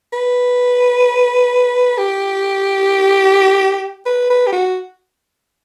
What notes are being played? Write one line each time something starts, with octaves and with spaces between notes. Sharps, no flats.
B4
G4
B4
B4
G4
F#4